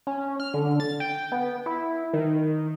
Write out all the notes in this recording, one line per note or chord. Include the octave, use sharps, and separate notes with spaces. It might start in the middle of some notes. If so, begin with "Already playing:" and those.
C#4
F6
D3
A6
G5
B3
E4
D#3